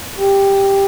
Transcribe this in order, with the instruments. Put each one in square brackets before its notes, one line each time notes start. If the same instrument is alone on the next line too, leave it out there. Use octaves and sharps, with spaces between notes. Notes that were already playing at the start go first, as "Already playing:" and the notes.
[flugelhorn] G4